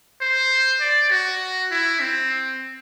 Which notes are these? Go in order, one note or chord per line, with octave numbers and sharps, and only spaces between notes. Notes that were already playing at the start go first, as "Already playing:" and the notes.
C5
D5
F#4
E4
C4